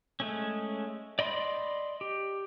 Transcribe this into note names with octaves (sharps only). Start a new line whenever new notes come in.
G#3 A3 C#4
D5 D#5 B5 C6
G4